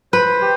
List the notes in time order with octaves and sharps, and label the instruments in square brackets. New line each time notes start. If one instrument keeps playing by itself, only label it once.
[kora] B4 [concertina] C5
[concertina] G4